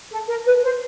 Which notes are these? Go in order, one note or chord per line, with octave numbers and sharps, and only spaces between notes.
A4
A#4
B4
C5